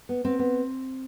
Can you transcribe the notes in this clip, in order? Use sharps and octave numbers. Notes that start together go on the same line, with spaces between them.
B3
B3 C4
B3